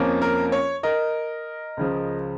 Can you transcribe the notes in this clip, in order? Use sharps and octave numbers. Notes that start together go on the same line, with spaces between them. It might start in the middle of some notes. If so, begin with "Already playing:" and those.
Already playing: F2 F3 A#3 C#4
A#4
C#5
A#4 D#5
C#2 C#3 F3